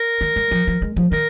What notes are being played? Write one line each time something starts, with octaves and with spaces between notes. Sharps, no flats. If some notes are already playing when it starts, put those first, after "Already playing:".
Already playing: A#4
D#3
G#3
F3
F3
G#3
F3
D#3 A#4